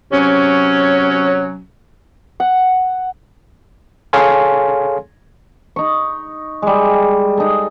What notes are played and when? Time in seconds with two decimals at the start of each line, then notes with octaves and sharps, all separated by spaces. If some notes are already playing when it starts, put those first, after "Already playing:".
0.12 C3 F#3 C#4
2.40 F#5
4.13 G#4 A4 C#5 F5 G#5 C6
5.76 D#4 C#6
6.62 G3 G#3
7.37 D#4 A4